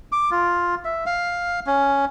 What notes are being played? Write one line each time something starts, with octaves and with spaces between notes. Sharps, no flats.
D6
F4
E5
F5
C#4